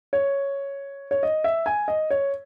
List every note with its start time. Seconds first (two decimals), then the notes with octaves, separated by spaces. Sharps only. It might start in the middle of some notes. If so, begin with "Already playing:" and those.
0.13 C#5
1.11 C#5
1.23 D#5
1.44 E5
1.66 G#5
1.88 D#5
2.10 C#5